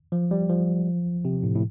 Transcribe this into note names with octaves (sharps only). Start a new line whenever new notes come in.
F3
G3
F3
C3
A2
A2